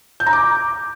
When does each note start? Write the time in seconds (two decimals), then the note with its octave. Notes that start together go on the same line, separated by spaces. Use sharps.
0.20 G6
0.26 A#5
0.33 D6